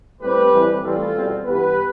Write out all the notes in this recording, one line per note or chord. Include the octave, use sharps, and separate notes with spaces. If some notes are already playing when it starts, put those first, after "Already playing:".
A2 G3 C4 G4 B4
A2 E3 G3 C4
A2 E3 G3 C4 F4 A4
E2 B2 G3 C4
G2 E3 B3 G4 B4